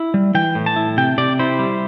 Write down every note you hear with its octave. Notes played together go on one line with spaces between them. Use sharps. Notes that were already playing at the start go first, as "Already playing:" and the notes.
Already playing: E4
G3
E3 G5
A2
A5
E4
C3 G5
C3 D5
E4 C5
G3